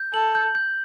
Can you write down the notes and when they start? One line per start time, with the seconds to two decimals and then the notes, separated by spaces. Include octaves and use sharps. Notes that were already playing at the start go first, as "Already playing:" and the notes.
Already playing: G6
0.13 A4 F#7
0.35 G6
0.55 G6